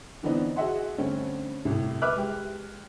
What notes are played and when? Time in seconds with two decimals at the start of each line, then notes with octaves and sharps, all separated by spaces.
0.23 D3 E3 B3 C4 D4 D#4
0.56 F#4 G#4 D#5 E5 F#5 C6
0.98 G2 D3 A3 C4 C#4
1.65 C2 A2
2.02 B4 E5 D6 F6 F#6
2.15 G#3 G4